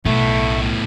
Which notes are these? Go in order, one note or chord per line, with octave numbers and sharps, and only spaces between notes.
B1 A2 A3 B3